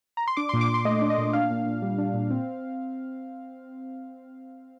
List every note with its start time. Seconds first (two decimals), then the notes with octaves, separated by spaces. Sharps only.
0.17 A#5
0.28 C6
0.37 D4 D6
0.49 A#2 C6
0.61 D6
0.69 A#2
0.74 C6
0.85 A3 D#5
1.02 D4
1.10 D#5
1.18 A#2
1.33 D4 F5
1.50 A#2
1.67 A#2
1.82 G3
1.98 D4
2.14 A#2
2.30 C4